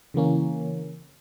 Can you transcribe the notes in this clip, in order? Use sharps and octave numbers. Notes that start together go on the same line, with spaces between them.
C#3 E3 A#3 C#4